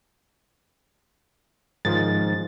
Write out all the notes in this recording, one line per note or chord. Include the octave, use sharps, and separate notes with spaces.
G#2 D#3 F3 A6